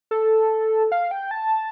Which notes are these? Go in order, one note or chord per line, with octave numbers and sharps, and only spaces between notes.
A4
F5
G5
A5